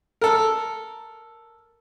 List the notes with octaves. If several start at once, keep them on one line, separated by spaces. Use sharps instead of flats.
A4 A#4